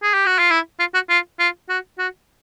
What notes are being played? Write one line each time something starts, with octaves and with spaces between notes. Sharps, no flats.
G#4
G4
F#4
F4
E4
F4
F#4
F4
F4
F#4
F#4